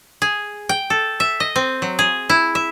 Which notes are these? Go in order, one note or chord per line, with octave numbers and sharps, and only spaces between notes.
G#4
G5
A4
E5
D#5
C4
F#3
G#4
E4
E5